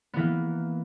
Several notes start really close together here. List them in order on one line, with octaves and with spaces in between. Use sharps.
B3 E3 A#3